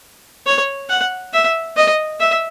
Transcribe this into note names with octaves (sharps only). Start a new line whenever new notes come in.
C#5
F#5
E5
D#5
E5